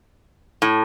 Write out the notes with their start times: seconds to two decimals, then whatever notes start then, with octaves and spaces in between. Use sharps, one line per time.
0.62 A2